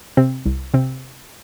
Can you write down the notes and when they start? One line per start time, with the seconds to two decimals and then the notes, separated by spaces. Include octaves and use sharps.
0.17 C3 C4
0.46 C2
0.74 C3 C4